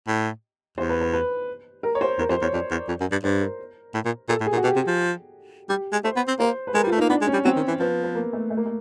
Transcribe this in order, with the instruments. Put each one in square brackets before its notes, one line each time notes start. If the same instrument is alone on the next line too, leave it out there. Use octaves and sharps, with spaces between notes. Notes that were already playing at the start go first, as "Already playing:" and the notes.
[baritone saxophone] A2
[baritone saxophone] E2 [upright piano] C5
[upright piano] B4
B4
B4
A#4
C#5
C5
[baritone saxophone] E2 [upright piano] A#4
[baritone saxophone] F2 [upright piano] C5
[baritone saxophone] E2 [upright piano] C#5
[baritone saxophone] F2 [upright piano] D5
[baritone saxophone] E2
F2
F#2
G2
[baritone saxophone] G2 [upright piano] C5
[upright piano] A#4
[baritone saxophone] A2
A#2
[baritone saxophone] A#2 [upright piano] A4
[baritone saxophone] A2
[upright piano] G#4
[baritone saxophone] A#2
[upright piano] F#4
[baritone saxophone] B2 [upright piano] G4
[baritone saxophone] C3
F3
[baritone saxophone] G3 [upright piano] G4
[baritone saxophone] G#3
[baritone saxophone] A3 [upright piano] C5
[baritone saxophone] B3
C4
[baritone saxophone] A#3 [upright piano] C5
[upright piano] B4
[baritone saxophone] G#3 [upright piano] A#4
[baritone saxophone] G3
[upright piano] F4
[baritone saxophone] A3
[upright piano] D#4
[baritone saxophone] A#3
[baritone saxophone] B3 [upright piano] D4
[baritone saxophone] G#3
[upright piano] C#4
[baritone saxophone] G3
[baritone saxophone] F#3 [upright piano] C4
[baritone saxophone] D#3
E3
[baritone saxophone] F3 [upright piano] B3
[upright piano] B3
A#3
A3
A3
A#3
A3